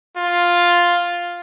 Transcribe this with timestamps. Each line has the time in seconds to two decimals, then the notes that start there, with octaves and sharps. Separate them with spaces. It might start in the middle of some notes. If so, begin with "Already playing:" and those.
0.17 F4